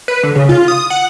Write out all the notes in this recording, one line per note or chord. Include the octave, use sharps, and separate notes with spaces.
B4
D3
C#3
F4
D#6
F#5